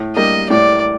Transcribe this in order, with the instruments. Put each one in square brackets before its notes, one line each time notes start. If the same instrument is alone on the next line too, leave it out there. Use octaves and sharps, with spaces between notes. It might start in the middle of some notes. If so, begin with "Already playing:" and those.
Already playing: [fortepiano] A2
[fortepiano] G3 A#3 D4 [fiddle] D#5
[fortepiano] A2 [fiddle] D5